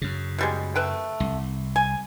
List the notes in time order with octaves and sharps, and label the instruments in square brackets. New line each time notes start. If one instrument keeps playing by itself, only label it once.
[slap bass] F#2 C#3
[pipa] B2 G3 G#3
A3 B4 G5
[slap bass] C2
[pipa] G#5